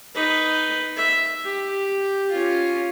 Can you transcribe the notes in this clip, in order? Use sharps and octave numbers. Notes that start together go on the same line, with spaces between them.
D#4 B4
E5
G4
C#4 F4